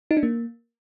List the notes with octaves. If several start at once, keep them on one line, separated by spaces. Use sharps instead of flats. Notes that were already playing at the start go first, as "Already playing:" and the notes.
D#4
D4
A#3